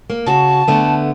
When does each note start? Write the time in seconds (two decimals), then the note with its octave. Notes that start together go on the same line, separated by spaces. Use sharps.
0.10 A#3
0.26 C#3 F#4 A5
0.68 D3 A3 B3